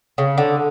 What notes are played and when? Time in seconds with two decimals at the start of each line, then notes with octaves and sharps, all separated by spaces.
0.18 C#3
0.38 D3